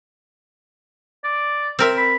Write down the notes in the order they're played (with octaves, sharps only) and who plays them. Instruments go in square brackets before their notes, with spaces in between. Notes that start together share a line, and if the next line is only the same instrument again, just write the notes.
[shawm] D5
[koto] C4 A#4 E5
[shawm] B5